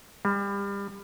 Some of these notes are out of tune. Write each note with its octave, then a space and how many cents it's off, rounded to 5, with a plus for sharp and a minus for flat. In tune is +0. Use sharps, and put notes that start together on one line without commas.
G3 +30